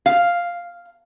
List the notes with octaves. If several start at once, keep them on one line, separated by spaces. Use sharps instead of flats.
F5